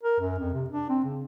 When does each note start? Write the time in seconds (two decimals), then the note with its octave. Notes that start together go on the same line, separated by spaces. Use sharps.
0.03 A#4
0.20 F#2
0.38 F2
0.54 C3
0.70 D4
0.89 C4
1.04 C#3